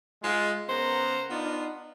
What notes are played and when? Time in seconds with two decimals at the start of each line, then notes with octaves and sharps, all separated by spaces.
0.23 G#3 F4
0.69 C#3 B3 A#4 C5 F#5 A#5
1.30 B3 D4 D#4 F4